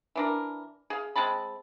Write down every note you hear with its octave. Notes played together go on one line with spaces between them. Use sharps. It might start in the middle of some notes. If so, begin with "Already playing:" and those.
E3 D4 A#4
G#4 F5
G#3 C4 A5 B5